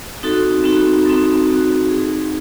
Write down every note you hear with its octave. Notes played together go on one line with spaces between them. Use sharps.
C4 D#4 F#4 A4
C4 D#4 F#4 A4
C4 D#4 F#4 A4
C4 D#4 F#4 A4
C4 D#4 G#4